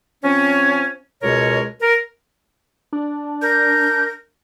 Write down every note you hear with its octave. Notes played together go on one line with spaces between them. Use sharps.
F3 C4 C#4
C#2 B2 G#3 A#4 C#5
A#4
D4
A#4 G6